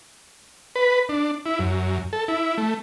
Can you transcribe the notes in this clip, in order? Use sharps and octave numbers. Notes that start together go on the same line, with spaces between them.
B4
D4
E4
F#2
A4
E4
A3